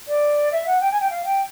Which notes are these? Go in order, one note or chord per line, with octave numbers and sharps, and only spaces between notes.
D5
E5
F#5
G5
G#5
G5
F5
G5